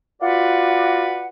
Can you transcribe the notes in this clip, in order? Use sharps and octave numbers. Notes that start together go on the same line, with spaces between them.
F4 F#4 B4 D5 F#5